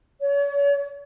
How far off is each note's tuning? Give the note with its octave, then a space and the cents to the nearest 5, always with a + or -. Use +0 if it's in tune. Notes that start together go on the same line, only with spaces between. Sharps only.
C#5 +40